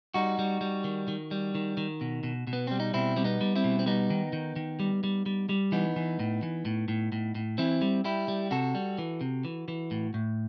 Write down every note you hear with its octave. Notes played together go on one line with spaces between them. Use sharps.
G3 D#4 F#4
G3
G3
D#3
D#3
G3
D#3
D#3
B2
B2
B2
B3
G3 C4
D#4
B2 C4 E4
G3 C4
B3 D#4
G3
C4 E4
B2
C4
G3 B3 D#4
D#3
D#3
D#3
G3
G3
G3
G3
E3 B3 D#4
E3
A2
E3
A2
A2
A2
A2
E3 C4 E4
G3
G3 E4 G4
G3
C3 F#4 A4
G3
E3
C3
E3
E3
A2
A2